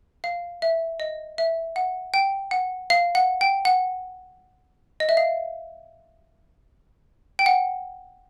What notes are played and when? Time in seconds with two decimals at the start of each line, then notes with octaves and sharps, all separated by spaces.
0.24 F5
0.62 E5
1.00 D#5
1.38 E5
1.76 F#5
2.14 G5
2.51 F#5
2.90 F5
3.15 F#5
3.41 G5
3.65 F#5
5.00 D#5
5.09 E5
5.17 F5
7.39 G5
7.46 F#5